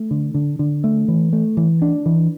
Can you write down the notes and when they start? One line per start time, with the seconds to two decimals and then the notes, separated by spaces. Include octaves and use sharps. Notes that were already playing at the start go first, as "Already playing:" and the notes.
Already playing: A3
0.11 D3
0.34 D3
0.59 D3
0.84 A3
1.08 E3
1.33 A3
1.57 E3
1.82 D4
2.06 E3